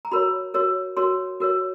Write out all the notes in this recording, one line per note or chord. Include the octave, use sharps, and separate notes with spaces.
A#5
F#4 A#4 C#5 B5
F#4 A#4 C#5
F#4 A#4 C#5 C6
F#4 A#4 C#5